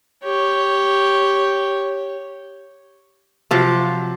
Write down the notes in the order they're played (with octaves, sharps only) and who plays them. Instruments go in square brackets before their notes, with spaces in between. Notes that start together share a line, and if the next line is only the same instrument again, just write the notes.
[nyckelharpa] G4 C#5
[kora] C3 F3 F#3